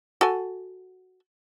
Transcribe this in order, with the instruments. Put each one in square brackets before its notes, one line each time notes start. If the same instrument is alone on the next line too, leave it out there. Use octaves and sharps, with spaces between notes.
[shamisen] F#4 A4 G#5